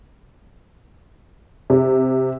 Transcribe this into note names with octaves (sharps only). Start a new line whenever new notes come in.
C3